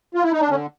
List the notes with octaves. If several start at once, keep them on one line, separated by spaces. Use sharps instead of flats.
F4
E4
D#4
D4
D3 C#4